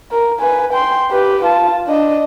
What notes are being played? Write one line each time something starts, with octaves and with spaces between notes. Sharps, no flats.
A#4
B4 G#5
G5 C6
G4 B4
F4 A5
D4 D#5